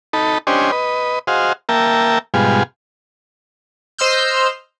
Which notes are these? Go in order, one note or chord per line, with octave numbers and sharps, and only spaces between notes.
D#4 A4 B5
C#4 D4 G4 C5 D#5 G#5
B4 D#5
F#4 G#4 C5 D#5 F5
A#3 A#4 E5 G5 A5
G#2 B2 G3 F4 G#4
C5 D#5 C6 E6 F6 G6